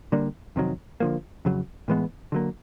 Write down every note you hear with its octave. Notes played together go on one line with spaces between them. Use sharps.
D3 G3 A#3 D4
F2 C3 D#3 F#3
D3 F3 A#3
F2 C#3 F#3
A2 E3 G#3 B3
D3 F#3 A#3